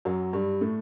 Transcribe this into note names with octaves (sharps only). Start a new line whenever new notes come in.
F#2 F#3
G2 G3
A2 A3